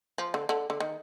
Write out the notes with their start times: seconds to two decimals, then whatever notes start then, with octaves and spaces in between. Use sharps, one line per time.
0.18 F3
0.34 D3
0.49 D3
0.70 D3
0.80 D#3